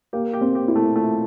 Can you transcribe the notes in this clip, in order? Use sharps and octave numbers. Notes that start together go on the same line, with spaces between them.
A#3 G4
G4
C4
G4
E4
A3
A3 F4